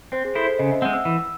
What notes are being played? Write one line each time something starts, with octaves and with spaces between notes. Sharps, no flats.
C4 C5
G#4
E4 A4 C5
C5
C#3 D#5
E5
G#3 C4 F#5
E6
E3